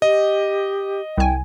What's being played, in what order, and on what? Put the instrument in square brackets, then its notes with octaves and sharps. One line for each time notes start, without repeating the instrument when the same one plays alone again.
[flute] G4 [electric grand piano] D#5
[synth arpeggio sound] C2 G#5 [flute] G5